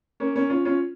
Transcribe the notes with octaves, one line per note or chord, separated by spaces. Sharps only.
A#3 C#4
A#3 C#4
C#4 F4
C#4 F4